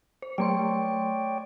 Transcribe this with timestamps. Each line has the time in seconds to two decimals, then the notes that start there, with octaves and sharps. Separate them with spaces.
0.22 C5
0.38 F#3 A3 C#5 D5 G5 C6